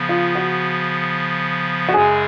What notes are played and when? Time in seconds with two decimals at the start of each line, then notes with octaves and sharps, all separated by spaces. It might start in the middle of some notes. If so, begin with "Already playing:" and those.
Already playing: C#3 F3 B3
0.09 F4
0.35 F#4
1.88 F#4
1.94 F#2 C#3 G#3 G#4